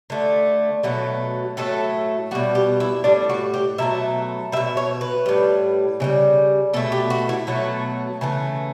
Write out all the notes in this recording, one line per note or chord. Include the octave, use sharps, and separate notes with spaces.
D3 A3
B2 F#3 A3
A2 F#3 A3 A4
B2 G3 F#4
G4
E4
A2 G3 D4
F#4
G4
B2 F#3 A3 E5
G3 E5
B2
C#5
B4
A2 G3
C#3 E3 G3
B2 A3 A4
G4
F#4
E4
B2 F#3 A3 F#4
C#3 E3 A3